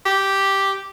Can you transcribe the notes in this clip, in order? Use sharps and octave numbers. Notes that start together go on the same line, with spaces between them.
G4